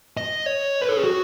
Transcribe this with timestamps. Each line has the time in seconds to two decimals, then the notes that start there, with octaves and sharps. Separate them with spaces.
0.17 D#5
0.46 C#5
0.81 B4
0.89 A4
0.97 G#4
1.04 F#4